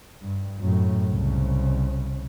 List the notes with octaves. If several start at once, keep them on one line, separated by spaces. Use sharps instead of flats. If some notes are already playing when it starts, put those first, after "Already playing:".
G2
F#2 A2
C2 C#3